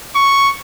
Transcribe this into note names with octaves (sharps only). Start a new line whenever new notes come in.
C#6